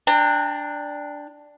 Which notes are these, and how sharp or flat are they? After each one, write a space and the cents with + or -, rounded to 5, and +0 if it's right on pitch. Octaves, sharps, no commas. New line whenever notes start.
D4 +0 G5 +25 A#5 -35